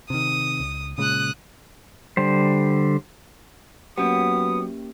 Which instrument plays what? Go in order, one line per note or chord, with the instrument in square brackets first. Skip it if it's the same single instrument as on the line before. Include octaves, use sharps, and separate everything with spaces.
[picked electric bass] C3 D#3 [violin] D#6
[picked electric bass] C#2
[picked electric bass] A#2 C#3 G#3 [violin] D#6 F#6
[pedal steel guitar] D3 G3 C5
[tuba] F#3 [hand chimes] A#3 C#4 G4 [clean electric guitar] B3 [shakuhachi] D#6